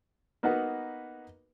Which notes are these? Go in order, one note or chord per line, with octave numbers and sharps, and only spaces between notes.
A#3 B3 D#4 F#4 B4 F#5